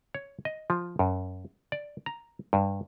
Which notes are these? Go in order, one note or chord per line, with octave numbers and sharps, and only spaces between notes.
C#5
D#5
F3
F#2
D5
A#5
G2